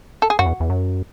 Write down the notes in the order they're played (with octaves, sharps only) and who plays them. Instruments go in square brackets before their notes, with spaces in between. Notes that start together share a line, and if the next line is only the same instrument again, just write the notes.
[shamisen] A4
G#4
[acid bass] F#2 [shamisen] F#4
[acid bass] E2
E2
F#2